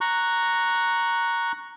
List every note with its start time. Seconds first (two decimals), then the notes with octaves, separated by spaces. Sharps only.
0.01 A#5 C#6 F#6